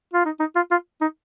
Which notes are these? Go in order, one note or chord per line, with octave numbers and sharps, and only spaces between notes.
F4
D#4
D#4
F4
F4
D#4